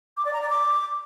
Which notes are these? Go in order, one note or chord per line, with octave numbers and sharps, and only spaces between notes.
D6
D5
A#5
D5
D6